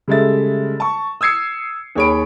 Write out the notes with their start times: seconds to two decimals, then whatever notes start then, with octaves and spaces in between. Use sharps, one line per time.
0.08 C#3 G3 G#3 A4 E5 A6
0.80 A5 C#6
1.21 D#6 E6 G#6 C7 C#7
1.95 D#2 G#4 C#5 B5 D7